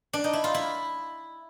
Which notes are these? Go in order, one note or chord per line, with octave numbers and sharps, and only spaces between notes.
D4
D#4
E4
F4
E4